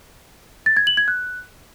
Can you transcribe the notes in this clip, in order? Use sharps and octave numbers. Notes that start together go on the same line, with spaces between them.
A6
G#6
F#7
G#6
F#6